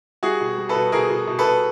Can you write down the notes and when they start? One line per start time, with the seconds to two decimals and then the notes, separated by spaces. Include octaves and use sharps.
0.23 G3 F#4 G#4
0.41 B2
0.58 G3
0.69 A4 B4
0.75 B2
0.92 B2 G#4 A#4
1.10 B2
1.27 B2
1.39 A4 B4
1.45 B2